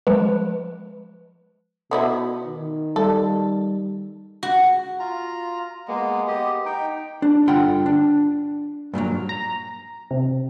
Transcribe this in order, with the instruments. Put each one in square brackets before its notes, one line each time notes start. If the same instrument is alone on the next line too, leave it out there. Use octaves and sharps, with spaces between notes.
[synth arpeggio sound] F3 G#3 [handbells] B4
[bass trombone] B2 [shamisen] B3 D#4 E4
[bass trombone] D#3
[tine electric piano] G3 [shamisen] A4
[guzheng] F#4
[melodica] F4 A#5
G#3 A#3 B3
B3 G4 D#5
D#4 G5
[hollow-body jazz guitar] D4
G2 D3 F4 F#5 G5 C6
D4
G2 A#2 E3 F#3
[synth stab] A#5
C3